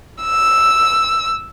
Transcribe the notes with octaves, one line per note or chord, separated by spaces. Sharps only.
E6